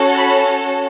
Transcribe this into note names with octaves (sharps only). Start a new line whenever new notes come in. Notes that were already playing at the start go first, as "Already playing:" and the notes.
Already playing: C#4 F#4 A4
B5